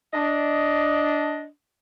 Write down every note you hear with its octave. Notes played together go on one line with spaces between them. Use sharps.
D4 D#5